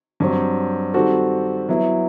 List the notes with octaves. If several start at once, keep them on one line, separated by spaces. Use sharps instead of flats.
G2 F#3 C4 F#4
D#3 G3 C4 F#4 A4
F#3 B3 E4